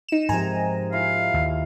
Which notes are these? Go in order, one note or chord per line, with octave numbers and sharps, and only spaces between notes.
D#4 E7
G#2 C3 F3 G#3 A#4 G#5 A#5
E4 F4 E5 F5
D#2